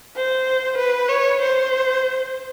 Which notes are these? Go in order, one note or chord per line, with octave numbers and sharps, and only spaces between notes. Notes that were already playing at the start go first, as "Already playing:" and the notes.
C5
B4
C#5
C5